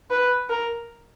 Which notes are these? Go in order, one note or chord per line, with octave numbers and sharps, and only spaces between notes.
B4
A#4